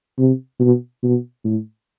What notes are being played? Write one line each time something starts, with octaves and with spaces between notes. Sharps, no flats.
C3
B2
B2
A2